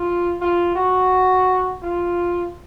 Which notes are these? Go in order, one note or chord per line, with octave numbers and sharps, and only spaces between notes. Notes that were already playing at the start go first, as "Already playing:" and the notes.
Already playing: F4
F4
F#4
F4